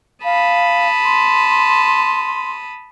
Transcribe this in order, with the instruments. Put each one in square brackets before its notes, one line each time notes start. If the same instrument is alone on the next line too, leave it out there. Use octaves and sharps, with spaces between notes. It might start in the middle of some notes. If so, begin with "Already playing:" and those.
[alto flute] F5 [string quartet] A5 B5 D#6
[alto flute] C6